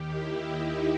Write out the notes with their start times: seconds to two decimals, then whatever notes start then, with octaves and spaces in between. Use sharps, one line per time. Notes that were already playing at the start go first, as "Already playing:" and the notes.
Already playing: D#2 D#3 G4
0.12 E4
0.45 D#4